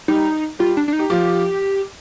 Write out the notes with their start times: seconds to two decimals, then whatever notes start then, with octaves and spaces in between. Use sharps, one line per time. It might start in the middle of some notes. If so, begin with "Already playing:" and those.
0.08 G3 D#4 G4
0.59 G3 F4 G4
0.77 D4
0.88 D4
0.93 D#4
0.99 G4
1.10 F3 F4 G4